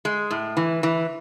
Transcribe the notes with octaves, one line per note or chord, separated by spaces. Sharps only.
G#3
A2
E3
E3